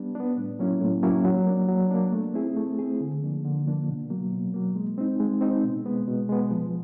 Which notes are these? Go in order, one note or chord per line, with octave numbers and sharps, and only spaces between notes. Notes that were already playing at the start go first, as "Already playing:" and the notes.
Already playing: G3 B3 D4
B3 D4
A2
F#3 A#3 C#4 E4
A2
F#3 A#3 C#4 E4
F#3
A#3 D4
F#3
A#3 D4
A3
C4 E4 G#4
A3
C4 E4 G#4
D3
F3 A#3 D4
D3
F3 A#3 D4
B2
F#3 A#3
B2
F#3 A#3
G#3
C4 D#4
G#3
C4 D#4
B2
G#3 B3
B2
G#3 B3
F3